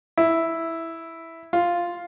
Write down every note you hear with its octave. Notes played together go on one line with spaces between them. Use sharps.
E4
F4